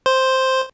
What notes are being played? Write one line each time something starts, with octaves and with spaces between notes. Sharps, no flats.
C5